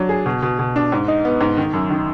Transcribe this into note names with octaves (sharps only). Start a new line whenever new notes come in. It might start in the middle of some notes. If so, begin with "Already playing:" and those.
Already playing: F#3 D4
G#4
B2
B2
B2
D4
G#2
D#4
B3
G#2
D#3
F#2
D#3